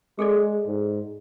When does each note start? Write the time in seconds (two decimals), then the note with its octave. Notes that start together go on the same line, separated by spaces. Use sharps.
0.19 G#3 G#4 A4 D5
0.66 G#2